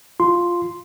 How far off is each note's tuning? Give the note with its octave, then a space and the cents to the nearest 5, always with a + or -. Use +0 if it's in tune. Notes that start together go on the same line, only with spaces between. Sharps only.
F4 +0 C6 +0